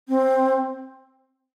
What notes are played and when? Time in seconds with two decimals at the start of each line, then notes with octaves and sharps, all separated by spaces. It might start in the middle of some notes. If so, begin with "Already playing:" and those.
0.08 C4